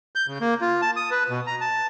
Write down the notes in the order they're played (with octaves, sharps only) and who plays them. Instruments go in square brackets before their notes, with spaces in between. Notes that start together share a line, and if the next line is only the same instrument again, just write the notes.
[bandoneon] G6
C#3
A#3
F4
A5
D#6
B4
B2
A#5
A5